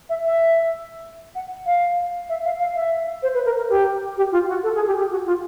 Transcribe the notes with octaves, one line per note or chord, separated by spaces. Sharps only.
E5
E5
F#5
F5
E5
F5
F5
E5
C5
B4
A#4
A#4
G4
G4
F4
F#4
A4
G#4
G4
G4
F#4
F4